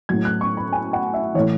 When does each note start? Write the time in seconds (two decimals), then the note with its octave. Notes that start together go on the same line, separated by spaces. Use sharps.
0.09 A2 F#3 G#6
0.25 F#6
0.41 C#6
0.57 B5
0.72 G#5
0.93 F#5
1.14 E5
1.35 E3 C#5
1.39 A2